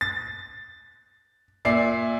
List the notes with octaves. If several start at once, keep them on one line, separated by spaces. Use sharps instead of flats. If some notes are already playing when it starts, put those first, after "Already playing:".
A6
A#2 D5 E5 C7